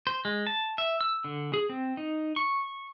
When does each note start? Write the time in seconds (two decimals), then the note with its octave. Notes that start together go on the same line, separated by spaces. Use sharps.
0.07 C5
0.25 G#3
0.47 A5
0.78 E5
1.01 E6
1.24 D3
1.54 G#4
1.69 C4
1.97 D#4
2.36 C#6